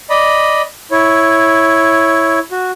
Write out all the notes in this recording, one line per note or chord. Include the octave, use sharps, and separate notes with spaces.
D5 D#5 B5
E4 C#5
F#4